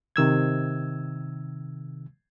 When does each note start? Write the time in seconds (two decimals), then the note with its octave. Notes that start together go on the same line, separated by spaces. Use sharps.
0.16 C3 D#3 E6 G#6